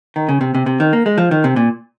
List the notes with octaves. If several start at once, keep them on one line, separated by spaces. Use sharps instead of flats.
D#3
C#3
C3
C3
C3
D#3
A#3
G#3
F3
D#3
C3
A#2